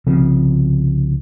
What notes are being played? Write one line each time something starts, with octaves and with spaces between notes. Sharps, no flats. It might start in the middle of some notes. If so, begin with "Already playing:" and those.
C2 C#3 F3 C4